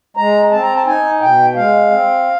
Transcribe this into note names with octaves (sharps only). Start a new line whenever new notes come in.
G#3 A#5
C4 A5
A#5
A5
D#4 G#5
B2 G5
G#3 F5
C4